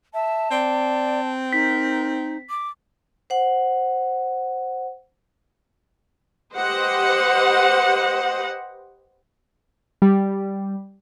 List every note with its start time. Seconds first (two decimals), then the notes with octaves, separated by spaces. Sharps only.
0.14 E5 A5
0.51 C4 D5
1.53 D#4 A#4 B6
2.50 D6
3.30 C5 F#5
6.55 G4 B4 C5 D#5 F#5
10.02 G3